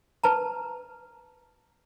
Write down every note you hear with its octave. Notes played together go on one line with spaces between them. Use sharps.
B4 A5 A#5